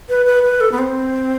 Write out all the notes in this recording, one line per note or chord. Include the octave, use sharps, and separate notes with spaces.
B4
B4
B4
A4
B3
C4